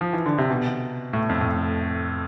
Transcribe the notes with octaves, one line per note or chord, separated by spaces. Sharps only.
F3
E3
D3
C3
B2
A2
F2
A2